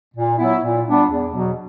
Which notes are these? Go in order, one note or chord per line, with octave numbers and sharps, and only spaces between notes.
A#2
F#3 B3 E4
A#2
G3 B3 D4
E2
B2 F#3